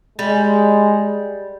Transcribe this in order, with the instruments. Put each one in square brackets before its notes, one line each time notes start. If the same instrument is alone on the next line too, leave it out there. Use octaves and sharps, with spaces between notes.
[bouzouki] G3 [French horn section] G#3